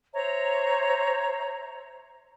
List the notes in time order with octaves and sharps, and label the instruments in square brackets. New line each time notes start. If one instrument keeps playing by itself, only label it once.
[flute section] C5 C#5 E5 A#5